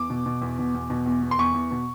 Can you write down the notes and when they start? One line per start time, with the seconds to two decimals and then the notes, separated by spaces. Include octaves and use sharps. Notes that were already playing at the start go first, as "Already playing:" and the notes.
Already playing: E2 D6
0.10 B2
0.26 B2
0.42 E2
0.59 B2
0.74 E2
0.90 B2
1.06 E2
1.22 E2
1.31 C6
1.39 E2 C#6
1.54 E2
1.71 B2